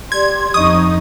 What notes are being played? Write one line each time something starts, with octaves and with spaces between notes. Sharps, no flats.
G4 D5 C6 G#6
F2 D#4 D#5 C#6 D#6